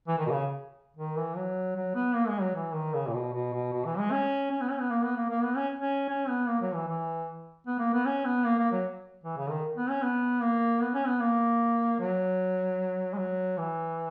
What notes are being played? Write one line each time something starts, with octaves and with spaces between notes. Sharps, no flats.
E3
D#3
B2
C#3
D#3
E3
F#3
F#3
B3
A#3
G#3
F#3
E3
D#3
C#3
A#2
B2
B2
B2
B2
E3
G#3
C#4
C#4
B3
C#4
B3
A#3
B3
A#3
A#3
B3
C#4
C#4
C#4
B3
A#3
F#3
E3
E3
B3
A#3
B3
C#4
B3
A#3
A#3
F#3
E3
C#3
D#3
B3
C#4
B3
A#3
B3
C#4
B3
A#3
F#3
G#3
F#3
E3